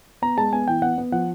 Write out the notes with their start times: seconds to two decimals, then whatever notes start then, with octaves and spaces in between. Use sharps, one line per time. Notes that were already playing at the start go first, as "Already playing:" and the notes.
0.22 B3 A#5
0.37 G#3 A5
0.53 B3 G#5
0.68 E3 G5
0.82 B3 F#5
0.98 B3
1.12 F3 F#5